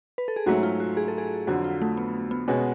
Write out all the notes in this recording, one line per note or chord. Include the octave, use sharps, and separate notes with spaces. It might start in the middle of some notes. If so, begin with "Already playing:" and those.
B4
A4
G#4
G#2 F#3 A3 C#4 F#4
F4
F#4
G#4
A4
G#4
F2 D3 F#3 F#4
F4
A3
B3
B3
B2 G#3 B3 C#4 F#4